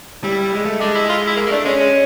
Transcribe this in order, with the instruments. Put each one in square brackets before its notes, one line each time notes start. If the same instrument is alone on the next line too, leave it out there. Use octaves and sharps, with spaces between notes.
[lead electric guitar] G3 [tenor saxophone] E4
[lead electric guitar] G#3
A3
[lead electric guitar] G#3 [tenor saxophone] D4
[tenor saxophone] E4
F4
E4
A#3
A#3
[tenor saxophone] A3 [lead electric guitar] D4
[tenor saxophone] G#3 [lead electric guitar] C#4
[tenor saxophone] G#3